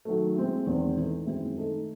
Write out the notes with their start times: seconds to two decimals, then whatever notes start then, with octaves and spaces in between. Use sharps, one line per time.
0.05 D#3 F#3 A3
0.36 G#3 C4 E4
0.66 E2 D#3 G#3 C4
0.97 E3 A3 D#4
1.26 F#2 D#3 G#3 C4 E4
1.57 D#3 A3 D#4